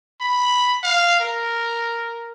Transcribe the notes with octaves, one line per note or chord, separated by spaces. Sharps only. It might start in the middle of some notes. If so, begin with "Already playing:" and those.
B5
F5
A#4